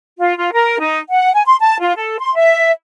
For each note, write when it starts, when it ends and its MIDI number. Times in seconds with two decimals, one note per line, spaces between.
0.19 0.36 65
0.37 0.49 65
0.53 0.78 70
0.80 0.99 63
1.09 1.32 78
1.33 1.43 80
1.46 1.56 84
1.61 1.77 81
1.81 1.96 65
1.97 2.17 69
2.19 2.34 84
2.35 2.71 76